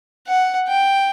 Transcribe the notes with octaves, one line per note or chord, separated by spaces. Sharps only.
F#5
G5